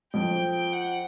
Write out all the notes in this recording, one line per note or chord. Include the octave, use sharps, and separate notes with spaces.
F2 F3 G5
F#5